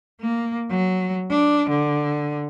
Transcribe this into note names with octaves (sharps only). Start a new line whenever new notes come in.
A#3
F#3
D4
D3